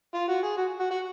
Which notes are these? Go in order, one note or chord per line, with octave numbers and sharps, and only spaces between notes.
F4
F#4
G#4
F#4
F#4
F#4